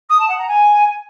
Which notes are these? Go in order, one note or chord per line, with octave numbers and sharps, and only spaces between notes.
D#6
A5
F#5
A#5
G#5